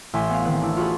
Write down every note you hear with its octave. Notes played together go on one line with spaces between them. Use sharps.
A1 E5 G#5 C6 B6 E7
B3 F5
D#3 C4 B4
D4 E4
F4 F#4 G#4 B5